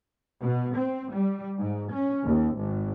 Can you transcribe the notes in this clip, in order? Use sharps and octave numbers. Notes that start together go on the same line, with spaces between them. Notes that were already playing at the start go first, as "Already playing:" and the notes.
B2
C4
G3
G#2
C#4
D#2
G#1